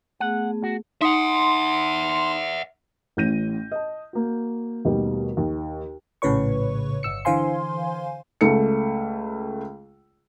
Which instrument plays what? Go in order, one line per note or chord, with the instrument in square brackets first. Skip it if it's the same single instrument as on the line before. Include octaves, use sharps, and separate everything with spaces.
[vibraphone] A3 B3 G#4 [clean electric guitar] F#5
[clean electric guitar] F#4
[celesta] D#4 D#6 C#7 [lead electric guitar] E5 F#5 [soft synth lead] C6
[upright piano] A1 A2 C#4 G6 A#6 D#7
D#5 A5
A#3 F#4
D#2 B2 G3 A3
D#2
[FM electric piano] A#1 A2 C#3 B4 C#5 C#6
G1 E6 C#7
D3 E3 C5 F5 G#5 C6
[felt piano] C#2 A3 C#7